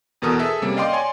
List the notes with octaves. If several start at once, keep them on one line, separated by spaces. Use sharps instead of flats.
E2 B2 A4 A#4 D#6
G#4 A4 E5
C3 G3 A#3 C#4
D5 D#5 F5 G5 C6 D6
C#5 D5 G#5 C6